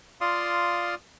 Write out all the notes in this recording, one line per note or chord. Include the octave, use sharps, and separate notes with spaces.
F4 D5 F5 C6 D#6